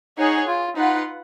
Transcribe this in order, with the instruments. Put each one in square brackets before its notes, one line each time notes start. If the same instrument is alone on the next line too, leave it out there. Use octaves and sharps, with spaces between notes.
[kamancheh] D#4 [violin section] G#4 C#5 F#5
[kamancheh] F4
[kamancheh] D#4 [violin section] F4 B4 F#5